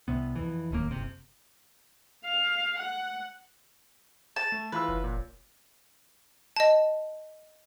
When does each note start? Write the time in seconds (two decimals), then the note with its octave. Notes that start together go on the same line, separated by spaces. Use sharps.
0.08 C2 C3 B3
0.36 F2 E3
0.71 D1 D#2 C#3 A#3
0.91 F#1 C3
2.24 F5
2.79 F#5
4.36 A5
4.52 A3
4.72 E3 F4 B4 E6
4.88 F#1
5.04 A#2
6.56 D#5 A5